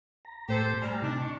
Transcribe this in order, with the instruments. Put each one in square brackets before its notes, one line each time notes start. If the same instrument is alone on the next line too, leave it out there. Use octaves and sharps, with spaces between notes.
[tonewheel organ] A#5
[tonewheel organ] A2 A3 [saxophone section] G4 A4 C5
[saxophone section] G3 [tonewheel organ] G#5 A#5 F6
[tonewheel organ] C3 D#4 [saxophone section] D4
[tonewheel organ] C#6